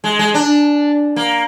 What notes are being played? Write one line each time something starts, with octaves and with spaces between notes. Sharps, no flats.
G#3
G#3
D4
A#3